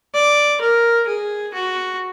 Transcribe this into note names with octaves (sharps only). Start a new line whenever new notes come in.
D5
A#4
G#4
F#4